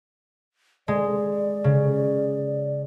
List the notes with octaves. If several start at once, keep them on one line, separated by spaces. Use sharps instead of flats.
G#3 D5
C#3